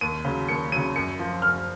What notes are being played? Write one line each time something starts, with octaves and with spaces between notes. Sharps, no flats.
D#2 D#7
C#3 F#3
D#2 C#7
C#3 F#3 D#7
F#2 C#7
F3
F#2 F6